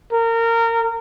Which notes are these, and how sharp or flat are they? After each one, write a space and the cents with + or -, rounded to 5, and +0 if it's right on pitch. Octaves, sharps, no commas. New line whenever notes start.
A#4 -25